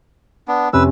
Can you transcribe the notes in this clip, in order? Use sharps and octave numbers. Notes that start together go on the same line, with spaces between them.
B3 D4
F2 C3 C#4 B4 E6